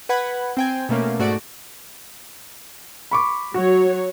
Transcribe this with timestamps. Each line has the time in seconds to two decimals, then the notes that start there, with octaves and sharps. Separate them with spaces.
0.09 B4 F#5 B5 G#6
0.57 C4 G5 G#5
0.89 B2 A3 A#3 C#4
1.19 G#2 A3 F#4 D5 D7
3.11 B5 C#6 D6
3.54 F#3 F#4 C#5